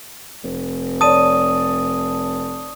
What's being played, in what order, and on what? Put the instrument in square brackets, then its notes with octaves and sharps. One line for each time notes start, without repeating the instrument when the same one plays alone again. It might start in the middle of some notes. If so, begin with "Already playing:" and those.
[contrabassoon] F1
[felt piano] C#5 D5 A5 [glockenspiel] D#6 D#7